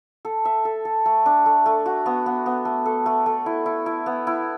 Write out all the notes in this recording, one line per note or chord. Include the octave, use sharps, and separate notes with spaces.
A4
E5
A4
A4
A3
D4
A3
A3
F#4
B3
B3
B3
A3
A4
A3
A3
E4
E4
E4
B3
E4